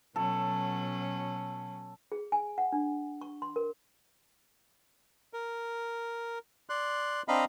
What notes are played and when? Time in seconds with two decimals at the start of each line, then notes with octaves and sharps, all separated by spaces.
0.16 B2 F#3 C#4 A4
2.12 G#4
2.32 G#5
2.58 F#5
2.72 D4
3.21 C#6
3.42 C6
3.56 A#4
5.33 A#4
6.69 D5 C6 F#6
7.28 C4 D4 D#5 F5 A#5 B5